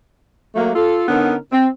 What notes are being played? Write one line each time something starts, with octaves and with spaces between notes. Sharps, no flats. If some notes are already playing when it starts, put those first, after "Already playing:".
F#3 A3 A#3
F4 A4
D3 B3 C#4 D#4 A#4
C4